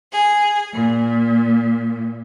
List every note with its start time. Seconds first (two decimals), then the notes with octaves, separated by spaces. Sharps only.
0.12 G#4
0.73 A#2